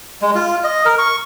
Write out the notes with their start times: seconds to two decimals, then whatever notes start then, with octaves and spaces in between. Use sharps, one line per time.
0.22 G#3
0.35 F4
0.64 D#5
0.85 A#4
0.98 C#6